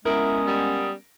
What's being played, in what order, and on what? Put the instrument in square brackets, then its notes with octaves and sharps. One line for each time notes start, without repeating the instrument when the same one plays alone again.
[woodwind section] G#3 B3 C#4 [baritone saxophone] E4 [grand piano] A#4 [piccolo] D#6
[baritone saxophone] G3